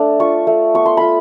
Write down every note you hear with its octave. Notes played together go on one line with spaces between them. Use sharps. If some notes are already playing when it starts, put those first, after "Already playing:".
Already playing: A3 D4
F4 C#6
A3
B3 C#6
C6
F4 B5